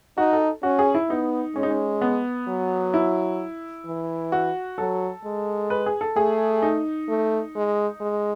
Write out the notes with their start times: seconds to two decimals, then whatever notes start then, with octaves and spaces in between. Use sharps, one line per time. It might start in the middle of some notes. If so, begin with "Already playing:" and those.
0.18 D#4 F#4
0.33 A4
0.63 C#4 F#4
0.79 G#4
0.95 E4
1.10 B3 D#4
1.56 G#3 C#4
1.63 D#4
1.70 C#4
2.01 B3
2.48 F#3
2.94 E4
3.86 E3
4.32 F#4
4.78 F#3 A4
5.25 G#3
5.70 B4
5.86 G#4
6.01 A4
6.16 A3 G#4
6.62 D#4
7.09 A3
7.55 G#3
8.01 G#3